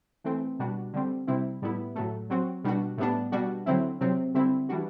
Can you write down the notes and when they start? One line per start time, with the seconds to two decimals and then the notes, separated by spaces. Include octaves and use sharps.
0.24 E3 A3 C4
0.59 B2 G3 D4 F#4
0.93 D3 G3 C4
1.27 C3 G3 C4 E4
1.62 A2 G3 B3 E4
1.95 A2 F#3 A3
2.30 F#3 C4 F#4
2.64 B2 G3 D4 F#4
2.97 A2 G3 B3 D4
3.32 B2 G3 D4 F#4
3.66 D3 F#3 C4 E4
4.01 C3 F#3 C4
4.34 D3 G3 C4 E4
4.69 E3 G3 D4 F#4